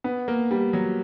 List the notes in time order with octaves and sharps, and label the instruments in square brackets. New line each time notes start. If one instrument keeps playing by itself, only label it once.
[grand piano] B3
A#3
G3
F#3